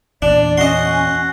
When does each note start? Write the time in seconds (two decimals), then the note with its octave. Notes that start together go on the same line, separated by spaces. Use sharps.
0.22 E2 A#2 D4 D5
0.58 C#4 F#4 D#5 F#5 C6